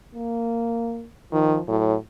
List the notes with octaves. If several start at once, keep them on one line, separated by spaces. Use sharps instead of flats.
A#3
D#3 F3
A2 F#3